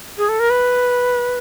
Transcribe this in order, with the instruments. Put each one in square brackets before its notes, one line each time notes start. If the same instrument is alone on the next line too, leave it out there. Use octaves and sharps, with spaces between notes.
[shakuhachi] G#4
A4
A#4
B4